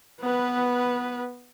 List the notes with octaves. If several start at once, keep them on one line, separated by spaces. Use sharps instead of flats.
B3 B4